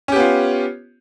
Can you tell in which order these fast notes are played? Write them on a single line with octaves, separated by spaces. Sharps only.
C#4 G4 B3 F4